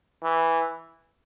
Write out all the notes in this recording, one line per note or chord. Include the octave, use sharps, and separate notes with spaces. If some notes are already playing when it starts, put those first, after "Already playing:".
E3